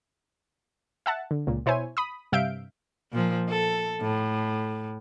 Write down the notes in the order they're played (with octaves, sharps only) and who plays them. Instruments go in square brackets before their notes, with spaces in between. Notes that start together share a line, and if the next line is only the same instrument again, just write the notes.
[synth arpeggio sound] E5 F#5 A5
D3
C#2 A#2
B2 E4 C5 C#5 G#5
B5 D#6
G2 C3 E5 F5 G6 D7
[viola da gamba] A#2 F3
A4
A2